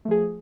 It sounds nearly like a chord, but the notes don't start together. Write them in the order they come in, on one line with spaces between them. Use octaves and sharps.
A3 F3 G#4